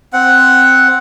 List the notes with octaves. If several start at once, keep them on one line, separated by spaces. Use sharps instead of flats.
C4 F#5